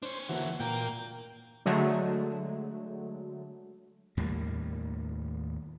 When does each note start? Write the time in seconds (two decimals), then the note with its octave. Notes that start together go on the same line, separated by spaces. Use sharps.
0.02 D4 C5 C#5
0.29 D3 E3 A#3 F#4
0.60 A#2 A#3 A#4 G5
1.66 D3 F#3 G#3 A3
4.17 D#2 A2 G3 A#3